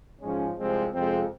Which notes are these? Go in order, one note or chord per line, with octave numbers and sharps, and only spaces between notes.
G#2 F3 G#3 C#4
C2 C3 F3 G#3 C4
F2 C3 F3 G#3 C4